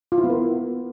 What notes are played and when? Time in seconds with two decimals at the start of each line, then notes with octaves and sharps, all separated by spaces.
0.12 F4
0.18 E4
0.24 B3
0.30 A#4